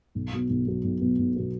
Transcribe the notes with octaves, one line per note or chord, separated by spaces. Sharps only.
B1
B2 F#3 B3
B1
B2 F#3 B3
B1
B2 F#3 B3
B1
B2 F#3 B3